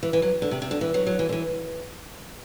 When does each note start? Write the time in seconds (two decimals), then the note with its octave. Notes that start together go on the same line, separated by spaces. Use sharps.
0.03 E3
0.13 E3
0.22 F#3
0.42 D3
0.51 C3
0.62 C3
0.71 D3
0.81 E3
0.94 F#3
1.07 F#3
1.19 E3
1.29 D3
1.32 E3